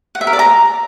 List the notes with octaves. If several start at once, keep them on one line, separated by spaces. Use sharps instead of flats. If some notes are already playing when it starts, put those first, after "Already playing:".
F#5
E5
A#4
D5
A#5